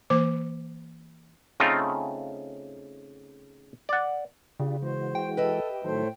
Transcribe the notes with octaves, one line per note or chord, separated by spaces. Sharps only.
E3 A#3 C5 D6
C#3 A3 C4 D#4 F4
D5 F#5
C#3 D4 F4 G4
E3 G#3 F#4 C5
G5
A4 B4 D#5 E5
G4
A2 D#3 F#3 A3 A4 C5